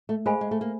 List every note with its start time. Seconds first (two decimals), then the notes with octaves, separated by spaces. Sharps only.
0.09 A3
0.26 G#3 G#4 C5 F5 G#5 B5
0.41 G#3
0.51 A3
0.61 A#3